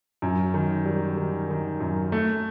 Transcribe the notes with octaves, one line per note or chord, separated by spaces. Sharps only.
F#2
D#3
G3
D#3
D#3
F#2
A3